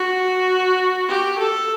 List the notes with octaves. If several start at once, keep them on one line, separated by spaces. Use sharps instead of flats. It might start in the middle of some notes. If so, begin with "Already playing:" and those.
Already playing: F#4
G4
A4